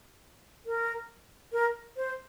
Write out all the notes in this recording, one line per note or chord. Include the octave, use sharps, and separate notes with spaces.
A#4
A#4
C5